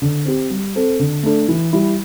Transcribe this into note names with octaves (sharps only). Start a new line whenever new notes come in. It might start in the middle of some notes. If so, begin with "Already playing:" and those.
D3
C4 G4
G3
C4 A4
D3
A3 D4 A4
E3
G3 E4